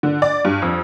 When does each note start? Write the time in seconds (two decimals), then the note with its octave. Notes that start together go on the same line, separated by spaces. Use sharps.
0.03 D3
0.22 D5
0.45 G2
0.62 F2